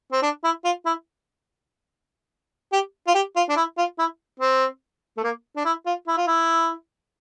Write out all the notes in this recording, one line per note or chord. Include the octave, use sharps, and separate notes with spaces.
C4
D4
E4
F4
E4
G4
F4
G4
F4
D4
E4
F4
E4
C4
A3
A#3
D4
E4
F4
E4
F4
E4